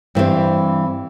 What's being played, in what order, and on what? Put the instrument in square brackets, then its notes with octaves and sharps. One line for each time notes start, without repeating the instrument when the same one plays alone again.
[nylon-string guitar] G2 E3 G3 C4